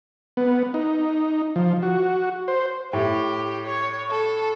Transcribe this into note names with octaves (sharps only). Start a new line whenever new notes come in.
B3
D#4
F3
F#4
C5
A2 G4
C#5
A4